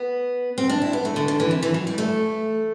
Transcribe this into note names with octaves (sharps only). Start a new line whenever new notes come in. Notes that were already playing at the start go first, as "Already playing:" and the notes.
Already playing: B3
C4
D4
E4
B3
A3
D3
D3
E3
C3
E3
F#3
G3
A3